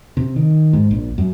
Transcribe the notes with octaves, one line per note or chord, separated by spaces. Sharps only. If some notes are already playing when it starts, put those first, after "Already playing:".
C3
D#3
G#2
A#1
F#2